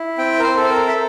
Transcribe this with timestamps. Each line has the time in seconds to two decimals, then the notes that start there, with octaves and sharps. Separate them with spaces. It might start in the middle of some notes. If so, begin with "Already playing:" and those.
Already playing: E4
0.18 C4 G5
0.39 A#4
0.43 C5
0.57 A4
0.64 C5
0.69 A#4
0.88 E5